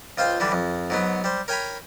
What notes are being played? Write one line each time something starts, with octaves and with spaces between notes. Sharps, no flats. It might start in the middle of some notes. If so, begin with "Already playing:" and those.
C#2 F4 C5 F5 G5
D3 E3 G3 D4
F2
G#2 F#3 B3
G3 C5
A#4 C#5 G5 G#5 A#5 B5